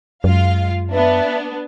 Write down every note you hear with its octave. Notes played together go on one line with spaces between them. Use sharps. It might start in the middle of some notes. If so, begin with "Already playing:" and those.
F#2 G#3 F4 F5
B3 D4 B4 E5